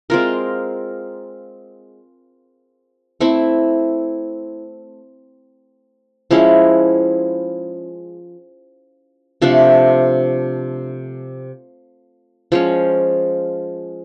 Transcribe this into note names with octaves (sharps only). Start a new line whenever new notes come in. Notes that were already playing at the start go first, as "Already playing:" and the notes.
G#3 C4 F4 A#4
A3 C4 E4
F3 G#3 C#4 E4
C3 F3 A3 D4
F3 G#3 C#4